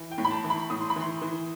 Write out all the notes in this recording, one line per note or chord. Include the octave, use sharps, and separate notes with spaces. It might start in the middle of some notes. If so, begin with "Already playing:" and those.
Already playing: E3
G5
A2
B5
A5
E3
B5
A2 D#6
C6
B5
E3 C6
E3